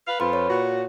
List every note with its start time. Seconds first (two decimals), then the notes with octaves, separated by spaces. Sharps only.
0.07 B4 F5
0.20 F2 F4 B4 B5
0.33 C#5
0.49 A#2 F#4